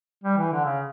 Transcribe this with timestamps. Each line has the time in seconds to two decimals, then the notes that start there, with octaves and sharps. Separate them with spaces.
0.24 G3
0.37 E3
0.52 D3
0.65 C#3